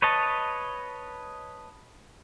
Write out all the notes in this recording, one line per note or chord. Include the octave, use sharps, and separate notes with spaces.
B4 C#5 D#5 A5